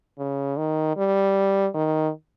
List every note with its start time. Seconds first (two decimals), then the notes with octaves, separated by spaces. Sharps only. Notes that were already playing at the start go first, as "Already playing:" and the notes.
0.18 C#3
0.57 D#3
0.97 G3
1.74 D#3